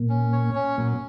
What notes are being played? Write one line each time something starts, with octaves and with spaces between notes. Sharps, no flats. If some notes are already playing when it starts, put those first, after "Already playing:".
Already playing: A#2 A#3
C#4
C#5
C#4
A#2 F#3 A#3